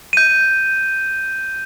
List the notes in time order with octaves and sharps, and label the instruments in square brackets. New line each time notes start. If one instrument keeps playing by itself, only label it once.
[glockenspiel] G6 D#7